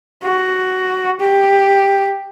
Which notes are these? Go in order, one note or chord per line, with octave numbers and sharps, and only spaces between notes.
F#4
G4